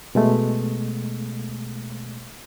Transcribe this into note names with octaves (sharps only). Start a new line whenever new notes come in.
B2 G#3 A3